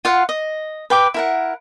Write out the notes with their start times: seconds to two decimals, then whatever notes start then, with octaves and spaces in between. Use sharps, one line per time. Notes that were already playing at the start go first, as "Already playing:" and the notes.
0.05 F4 F5 F#5
0.29 D#5
0.90 B4 G5 D6
1.14 E4 A#4 F#5